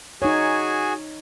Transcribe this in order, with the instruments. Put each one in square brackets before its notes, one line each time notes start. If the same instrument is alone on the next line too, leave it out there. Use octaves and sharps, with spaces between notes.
[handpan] D#4 C#5 [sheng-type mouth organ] F#4 G#4 G#5